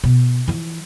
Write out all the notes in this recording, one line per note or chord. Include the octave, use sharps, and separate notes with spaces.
B2
E3 F3